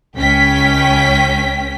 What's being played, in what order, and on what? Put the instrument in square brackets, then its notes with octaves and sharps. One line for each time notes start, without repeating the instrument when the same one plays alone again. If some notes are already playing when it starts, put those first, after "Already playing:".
[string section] C#2 C#4 G5 B6